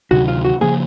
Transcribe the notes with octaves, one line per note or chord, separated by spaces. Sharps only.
D2 C3 D#3 F#3 F#4
F4
F#4
C#3 F3 A#3 G#4